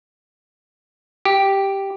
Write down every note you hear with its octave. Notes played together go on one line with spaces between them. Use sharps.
G4